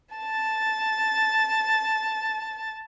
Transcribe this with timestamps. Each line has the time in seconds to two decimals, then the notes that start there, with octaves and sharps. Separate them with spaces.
0.15 A5 A6